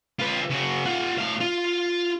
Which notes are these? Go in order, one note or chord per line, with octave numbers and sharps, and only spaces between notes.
F4 B4
C#3 F#4
F4 F#5
A2 F5
F4